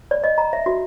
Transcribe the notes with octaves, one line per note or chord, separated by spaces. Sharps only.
D5
D#5
A#5
E5
F#4